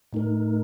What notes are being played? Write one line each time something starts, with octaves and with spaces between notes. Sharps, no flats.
A2 A3 D#4 A#4